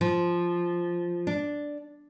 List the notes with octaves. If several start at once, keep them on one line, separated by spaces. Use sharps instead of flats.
F3
D4